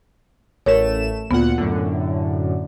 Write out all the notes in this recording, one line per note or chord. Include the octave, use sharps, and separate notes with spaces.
A1 A3 A#4 C#5 E7
D2 A#2 B3 F4 F#5
F#2 A2 D3